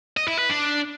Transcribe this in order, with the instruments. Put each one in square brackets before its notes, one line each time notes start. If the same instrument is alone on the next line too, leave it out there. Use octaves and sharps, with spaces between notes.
[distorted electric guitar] D#5
E4
B4
D4